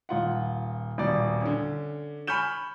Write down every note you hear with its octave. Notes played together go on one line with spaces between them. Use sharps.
D#1 F4 F#5
D#1 B2 D5
D3 C#4
G#5 B5 C#6 F6 G6 E7